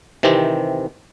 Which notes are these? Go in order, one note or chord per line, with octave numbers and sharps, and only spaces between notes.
C3 D#3 E3 C4 G4